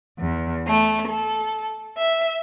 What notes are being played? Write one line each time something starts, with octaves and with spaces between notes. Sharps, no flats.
E2
A3
A4
E5